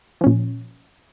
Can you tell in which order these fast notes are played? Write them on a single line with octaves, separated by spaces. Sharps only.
F3 C#4 A#2